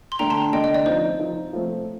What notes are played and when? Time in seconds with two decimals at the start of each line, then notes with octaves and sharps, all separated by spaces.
0.12 C6
0.19 D3 A3 D4 G5 A#5
0.30 A5 C6
0.53 D3 A3 D4 D#5 G5
0.64 D#5
0.74 D5
0.86 F3 C4 D#4 C5
1.19 F3 C4 D#4
1.53 F3 A3 C4